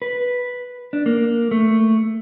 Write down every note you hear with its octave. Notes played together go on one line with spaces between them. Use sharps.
B4
D4
A#3
A3